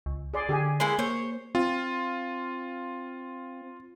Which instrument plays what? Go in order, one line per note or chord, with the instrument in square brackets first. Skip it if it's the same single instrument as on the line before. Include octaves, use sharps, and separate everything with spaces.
[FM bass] C#2
[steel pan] G#4 D5 C6
[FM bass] D3 [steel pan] G4 G#4 G#5
[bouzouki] G#3 A#3 E4 [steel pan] C6
[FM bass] A#3 [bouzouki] C5 C#5
[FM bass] C4 [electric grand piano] F4